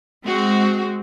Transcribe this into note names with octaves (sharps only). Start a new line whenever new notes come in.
G#3 C4 F#4